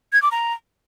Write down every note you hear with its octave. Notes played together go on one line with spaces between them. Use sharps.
G#6
D6
A#5